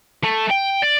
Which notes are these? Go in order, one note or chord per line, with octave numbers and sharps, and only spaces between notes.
A3
G5
D5